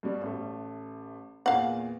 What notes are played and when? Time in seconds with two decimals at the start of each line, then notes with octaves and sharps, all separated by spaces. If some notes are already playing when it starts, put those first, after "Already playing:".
0.03 G2 B2 G3
0.21 A1 A3
1.46 E2 A#2 F5 F#5